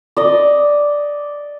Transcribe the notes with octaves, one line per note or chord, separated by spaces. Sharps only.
D5 D#5